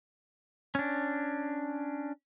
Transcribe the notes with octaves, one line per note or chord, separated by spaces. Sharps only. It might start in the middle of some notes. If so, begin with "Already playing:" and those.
C#4 D4